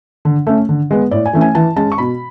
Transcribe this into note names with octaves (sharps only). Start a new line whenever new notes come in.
D3
A3 C#4
D3
G#3 B3
A2 D5
G#5
E3 A3 C#4
G#5
E3 A5
G#3 C#4 A5
C#6
B2 B5